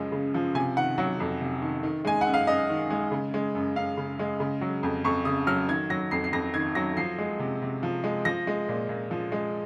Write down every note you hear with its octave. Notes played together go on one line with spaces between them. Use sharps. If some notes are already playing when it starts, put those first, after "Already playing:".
Already playing: F#2 C#3 F3 G#3
C#3
F3
C3 G#5
D#3 F#5
F#3 F#5
F2
C3
D#3
D#3
G#3 G#5
F#5
F#2
F5
F#2 D#5
D#3
G#3
C#3
G#3
F#2
F#2 F5
C#3
G#3
C#3
F#3
F2
F2 C#6
C#3 D#6
F#3 F6
D#3 G#6
F#3 A#6
F2 C7
C7
F2 A#6
D#3 G#6
F#3 A#6
F3 C7
G#3
C3
C3
F3
G#3
F3 A#6
G#3
A#2
A#2
F3
G#3